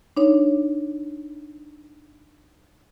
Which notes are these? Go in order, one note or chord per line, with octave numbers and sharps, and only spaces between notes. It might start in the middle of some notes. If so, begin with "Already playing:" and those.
D4 D#4 C#5